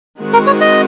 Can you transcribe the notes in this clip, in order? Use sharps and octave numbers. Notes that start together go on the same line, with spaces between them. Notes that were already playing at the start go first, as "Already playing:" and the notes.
D#3 G#3 C4 F#4
A#4
C#5
D#5